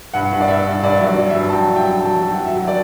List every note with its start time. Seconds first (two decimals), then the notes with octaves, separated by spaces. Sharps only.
0.14 G2 F#5
0.32 G2
0.41 D5
0.48 G2 E5
0.66 G2
0.83 G2 D5
0.98 F#3 E5
1.06 D5
1.18 F#3
1.29 E5
1.35 G2
1.49 A5
1.52 F#3 G5
1.70 G2
1.76 G5
1.88 F#3
1.99 A5
2.04 F#3
2.22 F#3
2.34 F#3 F#5
2.45 E5
2.56 F#3
2.68 D5